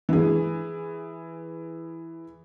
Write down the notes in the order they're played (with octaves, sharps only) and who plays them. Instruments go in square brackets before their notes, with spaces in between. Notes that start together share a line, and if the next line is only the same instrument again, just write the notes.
[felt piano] E3 G#4